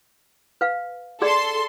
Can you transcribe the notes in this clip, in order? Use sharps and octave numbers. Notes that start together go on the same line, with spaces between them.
B4 F5
G#4 A4 D5 C6